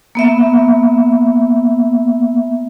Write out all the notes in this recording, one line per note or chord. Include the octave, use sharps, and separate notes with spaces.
A#3 B3 E5